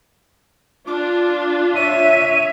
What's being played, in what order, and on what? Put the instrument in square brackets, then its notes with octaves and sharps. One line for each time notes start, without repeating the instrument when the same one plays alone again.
[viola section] D4 F4 [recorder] D6
[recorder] C#5 [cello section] E5 [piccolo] D#7